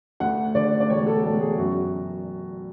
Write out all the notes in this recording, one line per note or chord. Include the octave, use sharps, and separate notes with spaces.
D2 F#5
D3 D5
D5
E1 C#5
A4
E1 A4
G#4
F#2 F#4